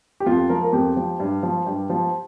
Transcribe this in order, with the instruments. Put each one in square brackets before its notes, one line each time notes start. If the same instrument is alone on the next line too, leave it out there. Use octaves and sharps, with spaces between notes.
[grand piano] G4
F2 F4
F3 A#4
A#4
F2 G4
F3
G2
F3
G2 G4
F3